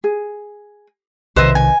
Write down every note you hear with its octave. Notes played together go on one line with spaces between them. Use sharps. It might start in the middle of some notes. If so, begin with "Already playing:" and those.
G#4
B1 C3 D#3 B4 C5 D#5 E5
G#5